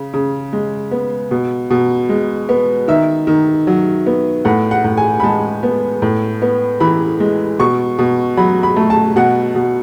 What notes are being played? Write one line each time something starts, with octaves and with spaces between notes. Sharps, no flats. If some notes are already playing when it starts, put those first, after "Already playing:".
Already playing: C#3
C#3
G#3
B3
B2
B2
G#3
B3
D#3 E5
D#3
F#3
B3
A2 F#5
F#5
A2
G#5
B5
G#3 A5
B3
A2
B3
E3 B5
G#3
B2 C#6
B2
F#3 B5
B5
A3
A5
B2 F#5
B2